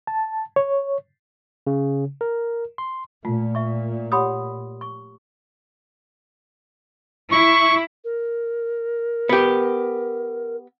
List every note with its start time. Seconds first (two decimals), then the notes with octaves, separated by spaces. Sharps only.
0.07 A5
0.56 C#5
1.67 C#3
2.21 A#4
2.78 C6
3.25 A#2 A3 F4
3.55 E5 C#6
4.12 G4 C#5 F#5 B5 C6 D#6
4.81 C#6
7.32 E4 C#6
8.04 A#4
9.29 B3 G4